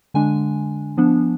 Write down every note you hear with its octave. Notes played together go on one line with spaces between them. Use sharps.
D3 G#3 D4 G#5
F3 B3 D4